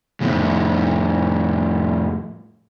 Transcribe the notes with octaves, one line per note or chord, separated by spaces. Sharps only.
F2 A2 C#3